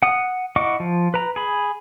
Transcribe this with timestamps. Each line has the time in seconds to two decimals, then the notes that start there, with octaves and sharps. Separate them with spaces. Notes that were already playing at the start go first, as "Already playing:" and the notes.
0.03 F#5 D#6
0.56 E4 D#5 F#5 C#6 D6
0.80 F3
1.14 B4 A#5
1.36 G#4 B5